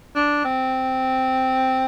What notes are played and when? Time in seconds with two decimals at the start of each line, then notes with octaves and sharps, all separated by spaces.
0.16 D4
0.45 C4